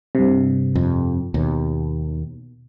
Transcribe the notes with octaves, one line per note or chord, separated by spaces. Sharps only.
G2 C3
F2
D#2 B2